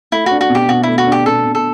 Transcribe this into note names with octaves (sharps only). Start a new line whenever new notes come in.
A3 E4
D4 F#4
F#4
B2
G4
B2 F#4
A3 E4
F#4
D4 G4
B2 A4
B2
A4